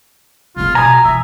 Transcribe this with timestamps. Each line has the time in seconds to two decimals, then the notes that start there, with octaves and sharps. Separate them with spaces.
0.56 C#3 B3 F4
0.75 B2 G#5 A#5 D#6
1.05 E3 E5